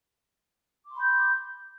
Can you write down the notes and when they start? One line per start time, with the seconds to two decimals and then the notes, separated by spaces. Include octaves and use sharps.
0.85 D6
0.90 C6
0.95 B5
1.00 G6